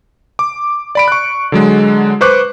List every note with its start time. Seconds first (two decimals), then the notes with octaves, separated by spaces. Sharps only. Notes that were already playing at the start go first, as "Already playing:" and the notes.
0.39 D6
0.95 D5 B5 D7
1.08 C#6 F#6
1.52 D3 F#3 G#3
2.21 B4 C5 C#6 D6 F#6